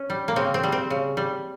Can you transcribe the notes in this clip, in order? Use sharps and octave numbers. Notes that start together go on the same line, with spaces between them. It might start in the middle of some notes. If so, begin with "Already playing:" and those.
Already playing: C#4
G3
A#3
C#3 C4
C4
G3
C4
C#3
G3